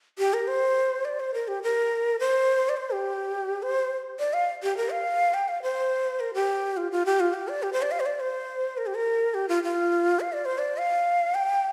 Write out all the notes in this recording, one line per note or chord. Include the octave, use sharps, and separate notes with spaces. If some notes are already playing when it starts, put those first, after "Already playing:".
G4
A#4
C5
D5
C5
A#4
G4
A#4
C5
D5
C5
G4
C5
D5
F5
G4
A#4
F5
G5
F5
C5
A#4
G4
F4
F4
G4
F4
G4
D5
G4
C5
D5
F5
C5
D5
C5
A#4
G4
A#4
G4
F4
F4
F5
D5
C5
D5
F5
G5